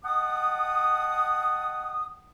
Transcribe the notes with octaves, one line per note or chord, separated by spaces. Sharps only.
D#5 F#5 G5 A5 D#6